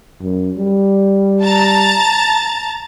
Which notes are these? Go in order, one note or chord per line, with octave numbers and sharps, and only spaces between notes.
F#2
G3
A5 A#5 A6